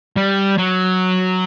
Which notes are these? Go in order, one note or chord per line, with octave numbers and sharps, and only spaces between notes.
G3
F#3